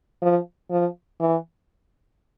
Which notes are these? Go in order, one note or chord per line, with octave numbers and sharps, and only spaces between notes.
F3
F3
E3